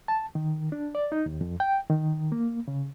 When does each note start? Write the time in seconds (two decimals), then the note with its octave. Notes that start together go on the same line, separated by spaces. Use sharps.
0.08 A5
0.35 D#3
0.72 D4
0.95 D5
1.12 D#4
1.26 D#2
1.41 F2
1.60 G5
1.90 D#3
2.32 A#3
2.68 C#3